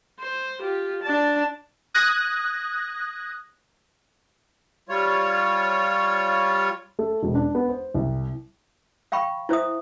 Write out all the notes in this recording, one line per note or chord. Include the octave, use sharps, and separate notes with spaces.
C5
F4 G4
D4 A5
D#6 F#6 G#6 A#6
G3 F4 C#5
A3
E1
D4
B3
C5
C2
F5 G5 B5 C#6
E4 C5 E5 D#6